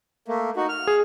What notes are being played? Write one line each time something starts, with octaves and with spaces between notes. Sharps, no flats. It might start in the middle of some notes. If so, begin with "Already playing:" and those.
A3 A#3
D#4 F#4
F6
G#4